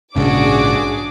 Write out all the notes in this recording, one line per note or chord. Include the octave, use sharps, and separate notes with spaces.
A#1 G#2 C#3 D4 F#4 G#4 D6